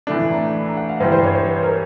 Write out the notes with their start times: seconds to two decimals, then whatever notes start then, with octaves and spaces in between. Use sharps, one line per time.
0.07 A2 E3 A3 D4
0.19 B5
0.30 A#5
0.42 A#5
0.53 B5
0.66 A#5
0.77 F#5
0.89 F5
1.00 G2 E3 G3 C5
1.12 C5
1.24 C#5
1.35 C5
1.47 B4
1.63 A#4